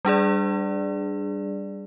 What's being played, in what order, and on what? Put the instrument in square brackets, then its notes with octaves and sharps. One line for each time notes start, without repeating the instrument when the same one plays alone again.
[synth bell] G3 D4 G#4 D5